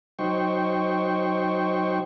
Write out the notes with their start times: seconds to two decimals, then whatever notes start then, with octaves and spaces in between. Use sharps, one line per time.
0.19 F#3 D#4 C5 G5 C#6